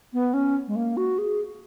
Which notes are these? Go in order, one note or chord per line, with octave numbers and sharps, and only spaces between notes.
B3
C#4
G#3
A#3
F#4
G#4